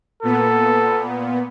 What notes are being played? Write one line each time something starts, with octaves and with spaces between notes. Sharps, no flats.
A#2 B3 A4